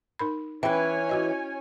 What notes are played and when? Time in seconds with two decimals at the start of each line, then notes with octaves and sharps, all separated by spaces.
0.19 D#4 A#4 B5
0.63 E3 C#4 B4 C#5 G5 G#5 B5
1.09 E4 F#4 D#5